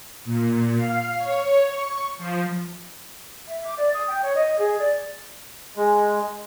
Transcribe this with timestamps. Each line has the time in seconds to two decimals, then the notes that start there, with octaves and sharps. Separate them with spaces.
0.25 A#2
0.76 F5
1.17 C#5
1.71 C#6
2.17 F3
3.47 E5
3.65 D6
3.77 D5
3.93 D#6
4.08 G5
4.22 C#5
4.35 D#5
4.59 G#4
4.79 D5
5.76 G#3